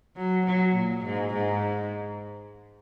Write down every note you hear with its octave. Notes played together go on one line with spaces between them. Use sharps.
F#3
F#3
A#2
G#2
G#2